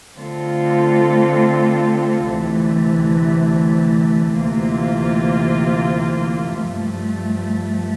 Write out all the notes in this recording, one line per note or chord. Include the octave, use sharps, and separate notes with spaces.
D3 A3 C4 F4 A4
D2 C3 E3 A3
D2 C3 E3 A#3 F4
G2 F3 A3